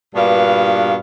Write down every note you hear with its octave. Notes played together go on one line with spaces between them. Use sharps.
G2 A#2 B3 D4 F#4 F5